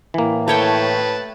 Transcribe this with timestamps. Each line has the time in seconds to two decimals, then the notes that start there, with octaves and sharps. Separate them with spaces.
0.14 A2 E3 A#3
0.48 A3 B4 C#5 G5 A5